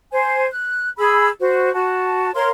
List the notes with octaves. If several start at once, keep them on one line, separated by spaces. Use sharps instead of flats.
C5 G#5
F#6
G#4 B5 E6
F#4 C5
F#4 A5
A#4 C#5 F5 C6